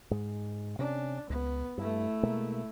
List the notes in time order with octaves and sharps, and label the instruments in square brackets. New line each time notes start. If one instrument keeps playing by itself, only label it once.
[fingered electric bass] G#2 G#3
[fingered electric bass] C3 C#4 [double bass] D4
[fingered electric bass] C#2 [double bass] B3
[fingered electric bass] G2 [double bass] A3 E4
[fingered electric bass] B2 G#3 A#3